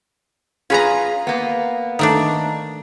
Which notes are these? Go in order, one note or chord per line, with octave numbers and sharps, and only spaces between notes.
C#4 F4 G#4 B4 A#5
A#3 B3
D#3 A3 D4